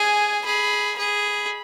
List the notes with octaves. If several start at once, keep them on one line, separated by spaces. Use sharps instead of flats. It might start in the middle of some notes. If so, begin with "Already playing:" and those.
Already playing: G#4 G#5
G#4 B5
G#4 B5